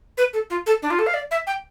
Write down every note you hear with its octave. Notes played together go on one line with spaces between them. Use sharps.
B4
A4
F4
A4
D4
F4
A4
F5
D5
E5
G5